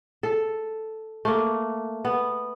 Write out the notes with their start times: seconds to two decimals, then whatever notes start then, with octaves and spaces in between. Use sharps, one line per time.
0.23 A4
1.25 A3 A#3
2.05 B3